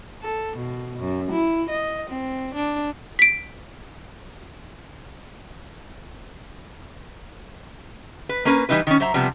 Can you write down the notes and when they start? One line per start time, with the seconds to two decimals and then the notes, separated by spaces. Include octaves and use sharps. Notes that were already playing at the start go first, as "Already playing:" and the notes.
0.22 A4
0.57 B2
0.99 F#2
1.31 E4
1.70 D#5
2.10 C4
2.54 D4
3.19 B6 D7
8.29 B4
8.45 A#3 C#4 A#4 B4
8.69 E3 G3 D#4 E4 B4
8.87 D#3 C#4
9.00 F#3 C5 E5 A#5
9.14 C3 F3 G3 B3